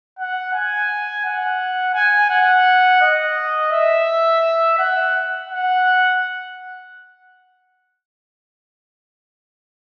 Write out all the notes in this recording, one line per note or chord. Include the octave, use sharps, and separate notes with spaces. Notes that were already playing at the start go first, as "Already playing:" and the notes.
F#5
G#5
F#5
G#5
F#5
D#5
E5
F#5
F#5